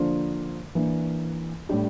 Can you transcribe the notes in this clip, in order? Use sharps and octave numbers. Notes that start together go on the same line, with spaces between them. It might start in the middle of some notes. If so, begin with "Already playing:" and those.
Already playing: D3 F3 A#3 D4 F4
E3 A#3 D4
A2 G3 D4 G4